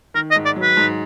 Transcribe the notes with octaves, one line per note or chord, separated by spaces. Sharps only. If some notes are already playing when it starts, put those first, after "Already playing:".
D#3 A#4
D#5
G#2
D5
F#3
B4
G#2